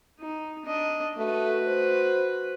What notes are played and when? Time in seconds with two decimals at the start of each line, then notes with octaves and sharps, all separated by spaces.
0.20 D#4
0.66 D4 D#5
1.17 A3 F#4 B4
1.67 C5